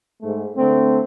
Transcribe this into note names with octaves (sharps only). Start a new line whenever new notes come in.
G#2 A3
D3 A3 C4